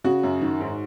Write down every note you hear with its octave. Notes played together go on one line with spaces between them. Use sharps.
C#3 F#4
F#2
D#3
G#2